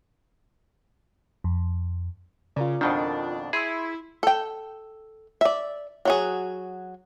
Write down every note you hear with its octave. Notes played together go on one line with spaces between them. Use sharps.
F2
C#3 F4 A#4 D5
F2 B2 D#3 D4
E4 G#4 B5 C6 E6
A4 G5
D5 E5
F#3 F#4 G#4